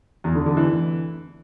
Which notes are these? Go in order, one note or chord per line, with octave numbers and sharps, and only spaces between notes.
E2
D3
D3
E3